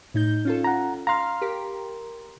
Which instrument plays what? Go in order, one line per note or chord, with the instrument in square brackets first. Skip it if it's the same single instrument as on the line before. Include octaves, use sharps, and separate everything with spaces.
[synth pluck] A2 D#4 G6
C#4 F4 A4
[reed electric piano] F#5 A#5
[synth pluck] F5 F6 [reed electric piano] A#5 C6
[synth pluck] G4 A#4